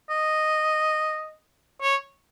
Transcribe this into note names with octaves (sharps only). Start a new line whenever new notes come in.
D#5
C#5